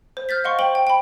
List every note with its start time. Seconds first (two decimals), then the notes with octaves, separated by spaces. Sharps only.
0.17 C5
0.29 F6 G6 A6 B6
0.44 D#5 F5 F#5 C6 C#6
0.59 C5 G5 F#7 G7
0.75 G5
0.87 G5 B5